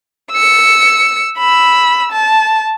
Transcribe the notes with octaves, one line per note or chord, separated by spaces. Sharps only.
E6 C#7
B5 E6
A5